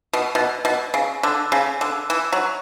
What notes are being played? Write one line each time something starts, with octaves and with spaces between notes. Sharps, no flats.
B2
B2
B2
C#3
D3
C#3
D3
E3
F#3